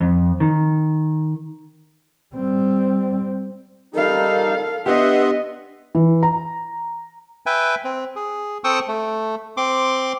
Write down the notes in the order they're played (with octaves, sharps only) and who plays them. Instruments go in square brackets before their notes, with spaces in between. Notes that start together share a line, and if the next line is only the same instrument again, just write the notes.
[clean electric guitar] F2
D#3
[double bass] G3 C4
[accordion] G3 D#4 [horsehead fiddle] A4 F5 [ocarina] A#4
[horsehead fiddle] B3 D#5 [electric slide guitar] D4 G4 [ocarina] B4 [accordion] E5 F#5 C6
[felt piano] E3
A#5
[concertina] B4 E5 G5 G#5
C4
G#4
C4 A4 G5 C#6 D#6 E6
A3
C4 C6 D6